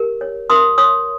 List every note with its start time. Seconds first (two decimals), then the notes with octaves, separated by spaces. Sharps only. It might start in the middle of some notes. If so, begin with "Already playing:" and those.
Already playing: G4 A#4
0.21 C#5
0.50 A#4 C6 D#6
0.78 C#5 C6 D#6